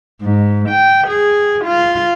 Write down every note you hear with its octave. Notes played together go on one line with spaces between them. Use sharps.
G#2
G5
G#4
F4